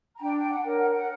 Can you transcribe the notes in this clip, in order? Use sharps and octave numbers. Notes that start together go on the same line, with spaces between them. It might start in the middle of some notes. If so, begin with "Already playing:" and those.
A#5
D4 G5
G5
F#5
A#4 C#5
F#5
F#5